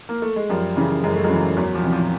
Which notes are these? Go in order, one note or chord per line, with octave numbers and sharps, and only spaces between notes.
A#3
A3
G#3
F#2 F3 G3
C#3 E3
F#2 G#3
A3
F#3 G#3
C#3 E3
E2 F#3
F3
C3 E3
F3